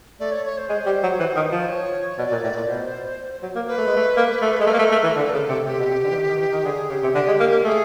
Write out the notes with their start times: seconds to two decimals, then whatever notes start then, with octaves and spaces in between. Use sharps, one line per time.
0.20 A3 D5
0.32 C#5
0.45 C#5
0.58 C5
0.69 G#3
0.86 G3
1.03 F#3
1.20 E3
1.36 D#3
1.52 F3
1.57 C5
1.69 C#5
2.18 B2 D5
2.31 A#2
2.44 A2
2.56 A#2
2.68 B2 C5
3.43 F#3
3.56 A#3
3.67 A#3 B4
3.78 A3
3.87 G#3
3.97 A3
4.17 A#3
4.42 A3
4.60 G#3 A4
4.66 A3 A#4
4.74 A#3
4.79 A3
4.92 A3
5.04 E3
5.16 D3 A4
5.33 C#3
5.49 C3
5.66 C3 G4
5.79 B2
5.90 C3
6.04 D3
6.11 E3
6.15 D#3
6.29 D#3
6.40 E3
6.53 D#3
6.65 D3 G#4
6.90 C#3 G4
7.03 C3
7.15 D3 G4
7.27 G#3
7.40 A#3
7.52 A#3
7.64 A3 G#4